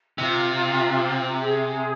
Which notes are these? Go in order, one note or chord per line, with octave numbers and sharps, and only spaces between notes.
C3 F4
G#4